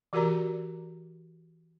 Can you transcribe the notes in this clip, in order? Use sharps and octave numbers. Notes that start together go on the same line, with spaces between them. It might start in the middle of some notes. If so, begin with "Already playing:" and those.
E3 F#4 G4 A#4 D5 A#5